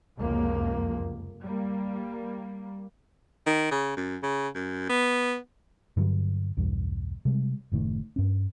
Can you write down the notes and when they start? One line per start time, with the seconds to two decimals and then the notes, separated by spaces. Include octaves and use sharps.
0.18 F1 C#2 F#2 F3 A#3
1.42 G3 A#3
3.46 D#3
3.71 C#3
3.97 F#2
4.23 C#3
4.55 F#2
4.89 B3
5.97 G2 D3 F#3
6.57 B1 E2 G2
7.25 C3 G3 G#3
7.72 F#1 A2 D#3 A3
8.16 G2 C#4